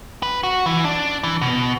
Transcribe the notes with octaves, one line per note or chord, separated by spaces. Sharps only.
B4
F#4
E3
D4
E3
B2